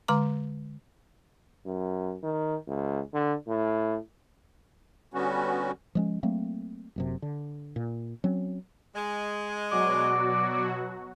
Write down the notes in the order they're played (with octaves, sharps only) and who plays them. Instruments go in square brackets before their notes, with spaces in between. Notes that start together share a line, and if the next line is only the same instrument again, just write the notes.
[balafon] D3 G#3 A#5 D6
[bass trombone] F#2
D#3
C#2
D3
A2
[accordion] D3 G3 B3 C#4 F#4
[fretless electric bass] F3 G#3 C#4
F#3 A3 A#3 C4
F#1 F#2 C3
D3
A#2
F#3 C4 C#4
[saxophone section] G#3
[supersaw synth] B2 F#3 F#4 [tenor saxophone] D5